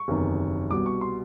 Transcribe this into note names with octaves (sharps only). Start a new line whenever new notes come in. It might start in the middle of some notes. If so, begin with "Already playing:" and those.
Already playing: C#6
F#1 E2 C3 D#3
C2 B2 G3 D6
C#6
C6